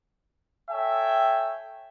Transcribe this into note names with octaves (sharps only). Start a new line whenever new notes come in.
A4 C#5 E5 G5 G#5